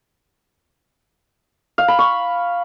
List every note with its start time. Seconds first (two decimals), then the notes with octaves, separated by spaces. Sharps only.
1.78 F5
1.88 B5
1.99 C#6